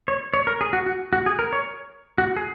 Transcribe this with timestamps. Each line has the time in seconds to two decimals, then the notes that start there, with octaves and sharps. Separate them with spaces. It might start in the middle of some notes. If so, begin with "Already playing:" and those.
0.08 C#5
0.34 C#5
0.47 A#4
0.61 G#4
0.73 F#4
0.86 F#4
1.13 F#4
1.26 G#4
1.39 A#4
1.53 C#5
2.18 F#4
2.37 G#4